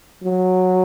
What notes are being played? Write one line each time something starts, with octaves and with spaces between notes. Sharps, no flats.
F#3